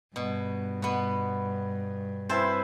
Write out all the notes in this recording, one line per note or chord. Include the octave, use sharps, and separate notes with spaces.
G2 B2
B2 B3
C4 E4 B4 C5 A5